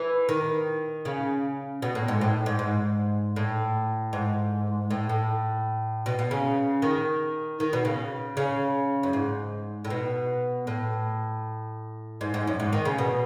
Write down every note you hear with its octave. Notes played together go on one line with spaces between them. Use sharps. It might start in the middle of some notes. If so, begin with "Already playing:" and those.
Already playing: E3
D#3
C#3
B2
A2
G#2
A2
G#2
G#2
A2
G#2
A2
A2
B2
B2
C#3
D#3
D#3
B2
C#3
C#3
F#2
G#2
A2
B2
A2
G#2
G#2
F#2
G#2
D#3
C#3
B2